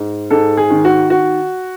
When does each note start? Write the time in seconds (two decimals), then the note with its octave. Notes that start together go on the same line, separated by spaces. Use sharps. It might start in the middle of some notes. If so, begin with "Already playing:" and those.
Already playing: G#2
0.30 G#2 A4
0.57 G#4
0.70 D#3
0.85 F#4
1.10 F#4